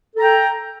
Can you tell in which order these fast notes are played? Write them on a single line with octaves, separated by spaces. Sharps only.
A4 A#5 G5